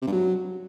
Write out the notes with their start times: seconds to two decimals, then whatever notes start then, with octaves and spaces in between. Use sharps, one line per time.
0.02 C3
0.07 G2
0.12 F#3